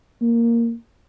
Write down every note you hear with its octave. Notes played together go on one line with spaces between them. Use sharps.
A#3